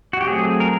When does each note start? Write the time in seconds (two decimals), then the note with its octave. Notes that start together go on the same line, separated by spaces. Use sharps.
0.13 F#4
0.21 G4
0.27 F#3 A3 C4 G#4
0.60 A#4